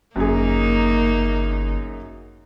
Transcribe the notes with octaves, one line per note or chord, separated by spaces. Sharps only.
G1 F#2 A#3 D#4 G#4